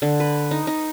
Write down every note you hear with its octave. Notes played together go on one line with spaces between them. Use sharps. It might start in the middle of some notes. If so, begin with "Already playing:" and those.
D3
B4
D#4
D#4